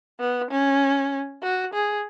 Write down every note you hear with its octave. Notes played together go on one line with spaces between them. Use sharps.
B3
C#4
F#4
G#4